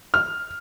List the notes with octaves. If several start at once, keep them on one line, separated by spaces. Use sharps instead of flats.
F6